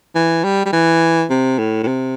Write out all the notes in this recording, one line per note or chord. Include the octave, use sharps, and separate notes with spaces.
E3
G3
G3
E3
C3
A2
A2
C3